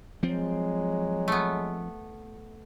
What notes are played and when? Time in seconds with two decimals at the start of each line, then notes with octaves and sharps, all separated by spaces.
0.23 F3 F#3 G#3 C4
1.28 A3 B3